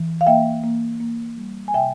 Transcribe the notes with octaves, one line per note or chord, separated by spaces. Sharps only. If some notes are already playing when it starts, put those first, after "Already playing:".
Already playing: E3
F5
A#3 E5 G5
A#3
A#3
G3
G#5
C3 E5 G5